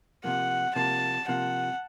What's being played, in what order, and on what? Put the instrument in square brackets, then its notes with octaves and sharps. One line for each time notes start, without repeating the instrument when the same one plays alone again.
[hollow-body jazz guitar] C3 F3 A#3 [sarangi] F#5
[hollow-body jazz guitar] C3 F3 A#3 [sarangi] A5
[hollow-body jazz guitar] C3 F3 A#3 [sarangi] F#5